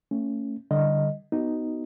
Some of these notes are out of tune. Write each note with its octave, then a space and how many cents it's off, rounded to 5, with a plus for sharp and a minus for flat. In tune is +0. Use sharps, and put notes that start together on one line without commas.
A3 +30 C#4 +0
D3 +0 G3 +0 D#5 +0
B3 +5 D#4 +0 F#4 +30